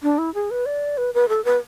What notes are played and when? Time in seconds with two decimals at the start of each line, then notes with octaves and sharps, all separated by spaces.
0.03 D4
0.18 E4
0.34 G#4
0.51 B4
0.66 D5
0.98 B4
1.14 B4
1.29 A4
1.45 B4